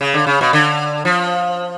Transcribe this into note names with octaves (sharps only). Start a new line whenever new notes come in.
C#3
D3
C#3
B2
D3
F3